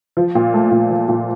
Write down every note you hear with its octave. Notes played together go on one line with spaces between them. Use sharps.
F3
A#2
A3
A#2
F3
A#2